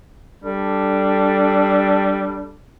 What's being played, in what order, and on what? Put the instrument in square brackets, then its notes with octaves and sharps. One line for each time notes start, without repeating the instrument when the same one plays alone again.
[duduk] G3 [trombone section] D4 A4